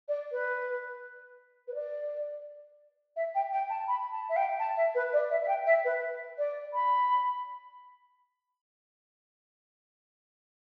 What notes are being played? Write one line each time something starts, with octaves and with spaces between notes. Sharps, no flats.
D5
B4
B4
D5
E5
G5
G5
A5
B5
A5
E5
G5
A5
E5
B4
D5
E5
E5
G5
E5
B4
D5
B5